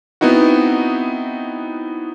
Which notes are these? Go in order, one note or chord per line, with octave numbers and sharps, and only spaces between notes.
B3 C4 D#4 E4 F#4